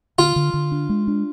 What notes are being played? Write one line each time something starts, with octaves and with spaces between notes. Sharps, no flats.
D3 F4
D3
D3
D4
G#3
D4